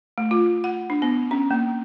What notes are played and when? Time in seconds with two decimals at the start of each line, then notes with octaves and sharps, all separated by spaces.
0.18 A3
0.31 F4
0.64 F#5
0.90 D4
1.02 B3
1.31 C#4
1.51 A#3